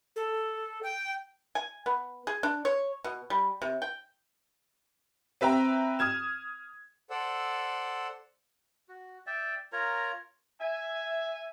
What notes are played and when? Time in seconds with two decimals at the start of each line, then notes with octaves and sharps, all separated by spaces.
0.16 A4
0.83 G5
1.55 G#5
1.86 B3
2.27 G#4
2.43 D4
2.65 C#5
3.04 B2
3.30 G3
3.62 C3
3.82 G5
5.41 C4 B4 E5 G5 A#5
5.99 D#6 F6 G#6 E7
7.10 A4 C5 D5 F#5 E6
8.89 F#4
9.27 D5 E5 G5
9.72 F4 A#4 C#5 A#5
10.60 E5 G#5